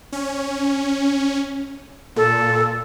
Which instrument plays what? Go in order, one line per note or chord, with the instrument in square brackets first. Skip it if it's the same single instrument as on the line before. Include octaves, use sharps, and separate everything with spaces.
[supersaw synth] C#4
[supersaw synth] A#2 [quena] A4